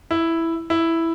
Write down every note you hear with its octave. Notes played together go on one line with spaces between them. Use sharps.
E4
E4